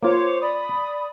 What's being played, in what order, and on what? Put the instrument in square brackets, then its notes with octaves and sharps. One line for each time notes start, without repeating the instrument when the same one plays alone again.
[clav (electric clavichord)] A#3 F4 [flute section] C5 C#5 D6
[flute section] D5 B5 D#6